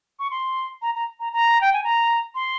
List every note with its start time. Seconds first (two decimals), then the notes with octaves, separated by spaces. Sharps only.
0.19 C#6
0.31 C6
0.82 A#5
0.95 A#5
1.20 A#5
1.33 A#5
1.61 G5
1.73 G#5
1.84 A#5
2.35 C6